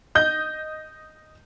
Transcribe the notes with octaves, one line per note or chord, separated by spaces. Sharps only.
D#5 G6